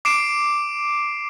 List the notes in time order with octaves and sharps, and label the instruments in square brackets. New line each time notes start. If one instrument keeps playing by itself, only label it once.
[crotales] D6 C7 D7 E7